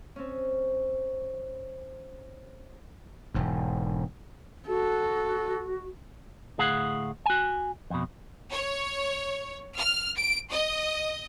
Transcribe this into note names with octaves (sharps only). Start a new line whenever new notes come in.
C4 C#4
E1 G#2
F#4 A4
D2 A2 G#4 F5 F#5
F#4 G#5
F2 B2
C#5
F6
D7
D#5